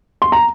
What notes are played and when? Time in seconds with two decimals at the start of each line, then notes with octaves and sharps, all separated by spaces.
0.22 C6
0.32 A#5